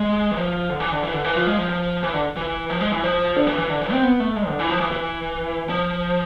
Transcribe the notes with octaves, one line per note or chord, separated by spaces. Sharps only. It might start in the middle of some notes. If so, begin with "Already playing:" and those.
Already playing: G#3
E3
F3
D3
E3
D3
E3
D3
E3
F3
G#3
F3
F3
E3
D3
E3
F3
G#3
E3
F3
D3
E3
E3
D3
E3
C4
B3
A3
G#3
D3
E3
F3
E3
E3
F3